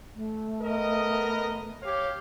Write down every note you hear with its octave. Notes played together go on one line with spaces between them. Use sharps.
A3
B3 A#4 D#5
G4 C#5 F5